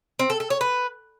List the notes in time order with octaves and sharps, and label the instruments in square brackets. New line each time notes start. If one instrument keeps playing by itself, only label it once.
[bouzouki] C4
A4
A4
C#5
B4